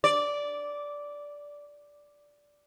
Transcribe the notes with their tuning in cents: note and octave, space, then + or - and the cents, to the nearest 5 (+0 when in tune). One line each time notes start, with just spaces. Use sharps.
D5 -10